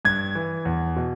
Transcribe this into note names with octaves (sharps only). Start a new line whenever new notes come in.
G2 G#6
E3
E2
B2